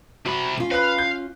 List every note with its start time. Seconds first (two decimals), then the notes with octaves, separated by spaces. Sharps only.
0.26 C3 F#4 B5
0.57 C#4 F4
0.71 B4 F5 F#6
0.98 G6